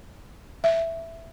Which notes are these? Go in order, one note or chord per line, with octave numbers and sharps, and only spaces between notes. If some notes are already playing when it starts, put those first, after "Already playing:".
E5